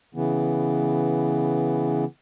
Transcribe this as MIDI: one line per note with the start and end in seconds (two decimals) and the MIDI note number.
0.15 2.05 49
0.15 2.05 52
0.15 2.05 59